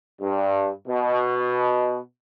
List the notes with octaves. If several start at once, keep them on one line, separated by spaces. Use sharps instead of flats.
G2
B2